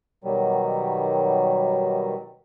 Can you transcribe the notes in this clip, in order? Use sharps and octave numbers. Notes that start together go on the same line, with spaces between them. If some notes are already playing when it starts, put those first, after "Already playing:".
B2 D#3 F#3 G3